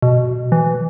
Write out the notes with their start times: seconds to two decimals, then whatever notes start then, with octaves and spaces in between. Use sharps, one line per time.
0.02 B2
0.52 E3